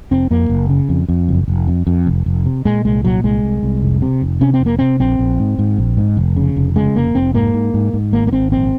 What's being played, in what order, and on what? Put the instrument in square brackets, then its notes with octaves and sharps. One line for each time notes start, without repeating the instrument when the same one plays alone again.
[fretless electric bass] F1 C4
F2 A#3
F#1
C#3
F2
F2
F#1
F1
F2
F2
F1
F1
C3
A#2 G#3
C2 G#3
A#2 F#3
C2 G#3
C2
C2
F1
C3
F1
C3 C#4
C4
F1
A#3
C3 C4
A#1 C4
A#1
G#2
G#2
A#1
G#2
F1
C#3
F1
C#3 G#3
F1 A#3
F1 C4
G#2 A#3
G#2
G#2
G#2
G#1 A#3
A#3
G#1 C4
A#1 C4